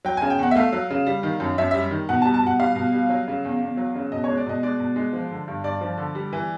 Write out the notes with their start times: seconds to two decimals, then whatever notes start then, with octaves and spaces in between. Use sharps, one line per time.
0.05 F#3 G5
0.17 C#3 G#5
0.30 G5
0.39 E2 F#5
0.51 E5
0.55 A3 F5
0.73 F#3
0.90 C#3
1.07 G3
1.23 D#3
1.40 F#2
1.58 F#2 E5
1.71 G3 E5
1.91 D#3
2.09 B2 F#5
2.22 A5
2.25 G3
2.34 A5
2.43 B2 F#5
2.60 G3 F5
2.76 B2
2.93 G3
3.10 F#3
3.28 C#3
3.44 E2
3.61 E2
3.77 F#3
3.95 C#3
4.12 B2 D#5
4.24 C#5
4.29 G#3
4.37 D5
4.46 B2 D#5
4.63 G#3 D5
4.79 B2
4.96 G#3
5.13 F3
5.31 D3
5.48 G2
5.64 G2 D5
5.81 F3
5.98 D3
6.15 G3
6.33 E3